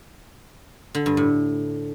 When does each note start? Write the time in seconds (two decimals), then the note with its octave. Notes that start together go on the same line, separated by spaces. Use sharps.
0.95 D3
1.06 G2
1.17 A2